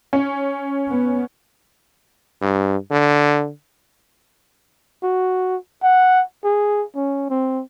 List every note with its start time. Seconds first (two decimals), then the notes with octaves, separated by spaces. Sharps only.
0.13 C#4
0.88 B3
2.41 G2
2.91 D3
5.03 F#4
5.83 F#5
6.44 G#4
6.95 C#4
7.30 C4